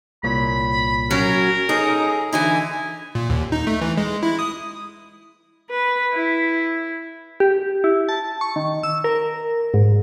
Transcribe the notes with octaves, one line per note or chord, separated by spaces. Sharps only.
C2 A#2 C#5 B5
F#3 C#4 A#4
D#4 G#4 A4 C#5
D3 E3 D#4 E4 G#5
A#2
D#2
D#4
A3
E3
G#3
E4
D#6
B4
E4
G4
E4
A5
C#6
D#3
E6
A#4
G#2